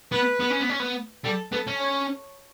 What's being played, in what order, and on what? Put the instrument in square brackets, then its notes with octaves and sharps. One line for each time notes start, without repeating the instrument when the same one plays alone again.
[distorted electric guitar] B3 [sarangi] B4
[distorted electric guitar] B3
C#4
B3
C#4
B3
[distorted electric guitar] G3 [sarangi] A4
[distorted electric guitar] B3 [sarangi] A4
[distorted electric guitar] C#4
[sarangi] C#5